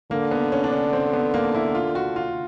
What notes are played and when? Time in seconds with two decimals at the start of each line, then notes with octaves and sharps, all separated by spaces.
0.11 D3 A#3
0.31 B3
0.52 C#4
0.64 D4
0.72 C#4
0.93 C4
1.13 B3
1.34 A#3
1.55 E4
1.75 F4
1.95 F#4
2.16 F4